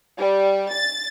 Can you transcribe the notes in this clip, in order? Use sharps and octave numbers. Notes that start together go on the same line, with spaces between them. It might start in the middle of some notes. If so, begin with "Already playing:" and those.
G3
A6